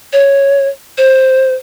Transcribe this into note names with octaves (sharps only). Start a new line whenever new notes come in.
C#5
C5